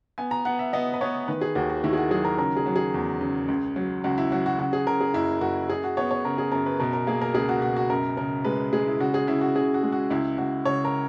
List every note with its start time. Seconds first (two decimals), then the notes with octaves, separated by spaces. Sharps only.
0.18 B3 G#5
0.31 A#5
0.45 B3 F#5
0.59 E5
0.73 B3 D#5
0.94 B4
1.01 B3 C#5
1.28 D#3 B4
1.41 G#4
1.55 D#2 F#4
1.70 F#4
1.84 D#3 E4
1.93 G#4
1.97 F#4
2.11 F#3 G#4
2.25 A#4
2.38 C#3 A#4
2.56 G#4
2.66 F#3
2.76 G#4
2.94 E2
3.21 C#3
3.48 C#2
3.76 F#3
4.04 C#2 F#4
4.18 E4
4.31 F#3 F#4
4.46 F#4
4.59 C#3 F#4
4.73 G#4
4.87 C#3 A#4
5.01 G#4
5.14 F#1 E4
5.41 F#1 F#4
5.69 F#2 G#4
5.84 F#4
5.97 B3 C#5
6.11 C#5
6.25 C#3 A#4
6.38 G#4
6.52 F#2 A#4
6.66 B4
6.80 B2 A#4
6.93 A#4
7.07 A#3 G#4
7.21 A#4
7.34 C#2 G#4
7.49 F#4
7.62 B2 F#4
7.76 F#4
7.90 F#2 A#4
8.17 C#3 A#4
8.45 G#3 B4
8.73 G#3 G#4
8.86 E4
9.00 C#3 F#4
9.14 G#4
9.27 C#3 E4
9.41 F#4
9.55 C#3 G#4
9.74 F#4
9.83 G#3
9.92 F#4
10.10 C#2 E4
10.38 C#2 F#4
10.65 C#3 C#5
10.85 A#4